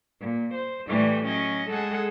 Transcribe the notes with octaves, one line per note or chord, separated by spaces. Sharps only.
A#2
C5
A2 E3 G3 A3
F#3 C#4 D#5
G#3 G#4 A4 F#5